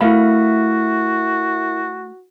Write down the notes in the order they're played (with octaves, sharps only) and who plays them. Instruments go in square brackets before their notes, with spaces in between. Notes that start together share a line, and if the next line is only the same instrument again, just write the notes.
[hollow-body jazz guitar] A3 F5 B5 [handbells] E4 A#4 E5 [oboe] F#4